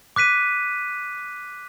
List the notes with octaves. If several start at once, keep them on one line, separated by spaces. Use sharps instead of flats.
D6 F#6 B6 D#7